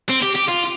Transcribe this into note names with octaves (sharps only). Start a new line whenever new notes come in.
C4
G4
G4
F4